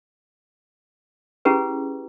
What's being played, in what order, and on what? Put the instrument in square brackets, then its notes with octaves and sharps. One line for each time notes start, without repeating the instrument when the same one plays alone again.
[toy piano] C#4 E4 G4 G#4 B4